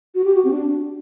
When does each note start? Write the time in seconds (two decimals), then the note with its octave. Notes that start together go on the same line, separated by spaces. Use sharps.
0.15 F#4
0.24 G4
0.35 F#4
0.45 C4
0.51 D4